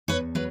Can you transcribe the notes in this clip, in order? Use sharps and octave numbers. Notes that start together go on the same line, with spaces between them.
E2 B4 C#5
F#3 B4